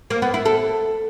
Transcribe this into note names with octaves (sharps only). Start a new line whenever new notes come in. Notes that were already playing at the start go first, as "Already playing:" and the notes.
A#3
B3
E4
A4